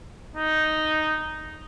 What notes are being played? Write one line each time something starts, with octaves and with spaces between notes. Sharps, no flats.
D#4